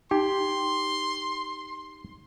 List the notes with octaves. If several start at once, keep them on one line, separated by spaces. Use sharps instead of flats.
D#4 G4 C6